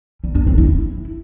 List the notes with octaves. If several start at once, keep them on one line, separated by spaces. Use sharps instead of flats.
G3
D4
C4
E4